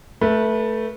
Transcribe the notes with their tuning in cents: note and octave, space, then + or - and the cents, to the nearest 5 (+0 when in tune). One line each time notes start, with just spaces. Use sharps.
A3 +0 B4 -25